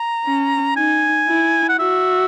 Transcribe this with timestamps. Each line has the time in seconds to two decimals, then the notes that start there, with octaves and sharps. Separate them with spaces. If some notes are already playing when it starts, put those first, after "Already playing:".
Already playing: A#5
0.25 C#4
0.76 D#4 G#5
1.27 E4
1.69 F#5
1.79 F#4 E5